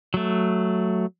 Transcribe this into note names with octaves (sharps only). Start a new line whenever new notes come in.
F#3 A3